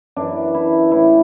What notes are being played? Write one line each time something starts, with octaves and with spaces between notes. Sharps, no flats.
F#2 E3 D4
E4
A2 E3 E4